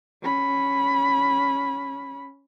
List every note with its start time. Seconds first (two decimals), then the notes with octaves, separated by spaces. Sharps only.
0.23 C#4 B5